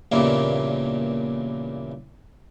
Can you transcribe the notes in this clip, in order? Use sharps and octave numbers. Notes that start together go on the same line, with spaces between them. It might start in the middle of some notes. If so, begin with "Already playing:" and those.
E2 G2 A#2 C#3 E3 A#3